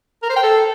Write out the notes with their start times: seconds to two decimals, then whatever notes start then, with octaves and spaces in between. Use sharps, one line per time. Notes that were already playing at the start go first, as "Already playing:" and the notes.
0.23 A#4
0.29 C5
0.36 G5
0.43 A4